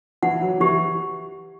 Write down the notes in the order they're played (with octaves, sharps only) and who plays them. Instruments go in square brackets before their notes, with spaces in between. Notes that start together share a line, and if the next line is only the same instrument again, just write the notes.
[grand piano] E3 [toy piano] F#5
[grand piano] F#3
[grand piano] E3 [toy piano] G4